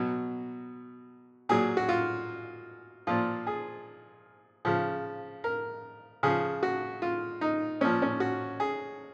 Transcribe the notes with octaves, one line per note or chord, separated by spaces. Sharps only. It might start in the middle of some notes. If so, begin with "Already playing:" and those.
Already playing: B2 F#3
A#2 F#3 G#4
F#4
F4
A#2 F3 F4
G#4
C#3 F3
A#4
C#3 F3 G#4
F#4
F4
D#4
A#2 F3 C#4
C#4
F#4
G#4